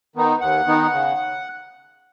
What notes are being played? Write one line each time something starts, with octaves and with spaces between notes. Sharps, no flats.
D#3 B3 D#4
D#2 F#5
D#3 B3 D#4
C#3